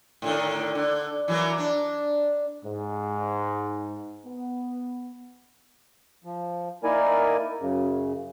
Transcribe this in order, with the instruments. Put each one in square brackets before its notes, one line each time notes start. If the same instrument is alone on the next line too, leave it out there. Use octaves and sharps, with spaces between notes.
[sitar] A2 D3 D#3
D3
E3 F#3 A#3
D4
[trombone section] G#2
B3
[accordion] F3
A#3 D#4 E4 A#4 D5 G#5
F#2 C#3